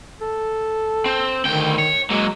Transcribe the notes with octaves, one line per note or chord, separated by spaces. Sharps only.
A4
C4
D2 D#3 G5
C#5
F#3 G#3 A#3